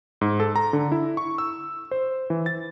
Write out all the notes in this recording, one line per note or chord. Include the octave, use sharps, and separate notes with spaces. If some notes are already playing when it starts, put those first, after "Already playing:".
G#2
A4
A#5
D3
E4
C#6
E6
C5
E3
A6